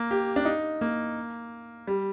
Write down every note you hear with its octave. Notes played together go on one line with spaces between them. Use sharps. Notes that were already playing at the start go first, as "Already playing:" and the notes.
Already playing: A#3
G4
D4
D#4
A#3
G3